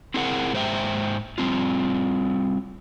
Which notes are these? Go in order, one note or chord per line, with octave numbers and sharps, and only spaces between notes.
C4 E4 G#4 A#4 F#5
G#2 C5 E5 G5
G3 C4 F4